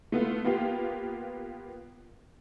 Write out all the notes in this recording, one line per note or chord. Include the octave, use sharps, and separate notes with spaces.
A3 B3 F4
A#3 B3 F4 G4 F5